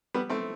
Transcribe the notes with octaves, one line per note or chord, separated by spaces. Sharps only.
G3 B3
A3 C4